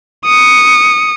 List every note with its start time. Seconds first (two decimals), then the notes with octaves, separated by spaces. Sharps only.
0.25 D#6 C#7